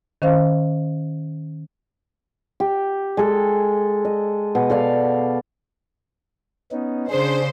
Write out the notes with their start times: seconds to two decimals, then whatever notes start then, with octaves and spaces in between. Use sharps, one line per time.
0.22 D#3 C#4 C5 F5
2.60 G4
3.17 G#3 A4
4.05 D#5
4.55 B2
4.70 A4 D5 F5
6.72 B3 C#4 D#4
7.10 C#3 D4 G#4 C5